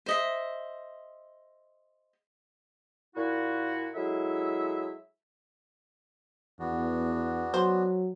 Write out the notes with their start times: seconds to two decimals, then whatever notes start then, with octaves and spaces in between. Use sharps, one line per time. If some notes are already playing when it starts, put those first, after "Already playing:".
0.06 C5 D#5 E5
3.16 A#2 E4 F#4
3.94 F#3 G#3 E4 A4 E5
6.59 E2 B3 D4 F#4
7.54 F#3 C5